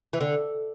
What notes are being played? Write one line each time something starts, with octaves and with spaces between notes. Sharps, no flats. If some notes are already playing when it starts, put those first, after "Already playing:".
E3
D3